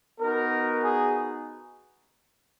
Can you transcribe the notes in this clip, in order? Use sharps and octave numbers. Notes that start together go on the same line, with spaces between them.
B3 D#4 F#4 A#4
G#4